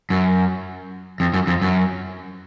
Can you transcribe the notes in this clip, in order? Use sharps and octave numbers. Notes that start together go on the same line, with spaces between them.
F#2
F2
F#2
F2
F#2